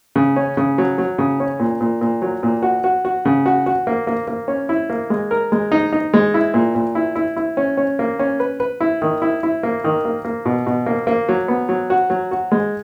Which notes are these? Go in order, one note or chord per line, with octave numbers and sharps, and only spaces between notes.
C#3
C#4
C#3
F#3
F#3
C#3
C#4
A#2
A#2
A#2
F#3
A#2
F#4
F#4
F#4
C#3
F#4
F#4
A#3
A#3
A#3
C#4
E4
A#3
G#3
A#4
G#3
D#4
D#4
G#3
E4
A#2
A#2
E4
E4
E4
C#4
C#4
A#3
C#4
B4
B4
E4
D#3
E4
E4
A#3
D#3
A#3
A#3
B2
B2
A#3
A#3
F#3
B3
F#3
F#4
F#3
F#4
G#3